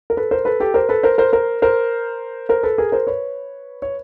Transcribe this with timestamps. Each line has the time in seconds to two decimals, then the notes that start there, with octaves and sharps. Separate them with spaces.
0.10 A#4
0.17 A4 B4
0.31 A#4 C5
0.45 A4 B4
0.60 G4 A4
0.74 A#4 C5
0.89 A4 B4
1.03 A#4 C5
1.18 A#4 C5
1.33 A#4 C5
1.62 A#4 C5
2.49 A#4 C5
2.63 A4 B4
2.78 G#4 A#4
2.92 A#4 C5
3.07 B4 C#5
3.82 C#5